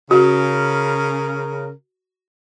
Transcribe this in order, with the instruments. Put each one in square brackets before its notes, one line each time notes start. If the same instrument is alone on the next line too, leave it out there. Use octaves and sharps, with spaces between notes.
[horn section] C#3 A#4 [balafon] F#4